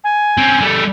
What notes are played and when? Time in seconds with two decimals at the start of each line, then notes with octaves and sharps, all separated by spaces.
0.04 G#5
0.38 C4 C#4
0.61 G3 A3